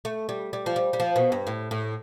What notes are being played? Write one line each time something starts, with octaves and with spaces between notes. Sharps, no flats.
A3
G3
G3
F3
G3
G3
F3
B2
G2
A2
A2